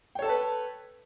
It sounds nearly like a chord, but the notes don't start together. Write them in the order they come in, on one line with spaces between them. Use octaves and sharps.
G5 C#5 A4 A5 B4